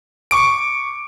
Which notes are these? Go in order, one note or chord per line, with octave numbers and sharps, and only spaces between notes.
C#6 D6 D7